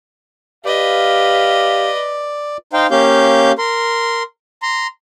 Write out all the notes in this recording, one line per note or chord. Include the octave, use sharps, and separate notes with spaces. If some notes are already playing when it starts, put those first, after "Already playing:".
G4 B4 D5 D#5 F5
D#4 C5 F5 G5
A#3 C#4 G4 F5 G6
A#4 C6
A#5 C6